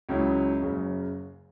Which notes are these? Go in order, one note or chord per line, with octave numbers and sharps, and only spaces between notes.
C#2 C#3 F#3 C#4 E4
F#1 F#2 C#3